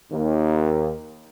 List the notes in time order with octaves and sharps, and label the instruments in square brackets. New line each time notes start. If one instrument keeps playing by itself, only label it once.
[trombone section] D#2